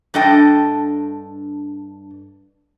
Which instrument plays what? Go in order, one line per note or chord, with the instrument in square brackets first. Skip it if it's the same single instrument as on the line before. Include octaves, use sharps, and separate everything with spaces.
[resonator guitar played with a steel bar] G2 D4 A4 D#5 G5